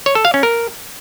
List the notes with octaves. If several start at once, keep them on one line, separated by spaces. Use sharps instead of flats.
C#5
A4
F5
C#4
A#4